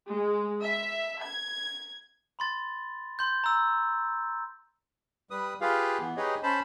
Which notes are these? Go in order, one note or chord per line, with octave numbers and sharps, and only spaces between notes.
G#3
E5
G#6
B5 C6 A6
C6 G6
A#5 E6
G3 B4 D#6
F4 G4 G#4 B4 F5
E3 B3
D#4 G4 G#4 B4 C#5 D#5
C#4 C5 A5 B5